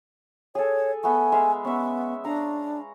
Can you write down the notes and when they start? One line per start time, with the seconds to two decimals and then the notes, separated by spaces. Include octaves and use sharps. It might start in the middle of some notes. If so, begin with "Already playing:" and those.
0.55 G#4 A4 C#5
1.04 A3 B3 G#5 B5
1.32 G#3 E5 F5
1.65 B3 C#4 E5
2.25 D4 F5 A#5